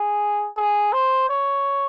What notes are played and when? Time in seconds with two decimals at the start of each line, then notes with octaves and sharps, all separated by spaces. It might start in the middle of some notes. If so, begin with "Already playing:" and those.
Already playing: G#4
0.57 G#4
0.92 C5
1.29 C#5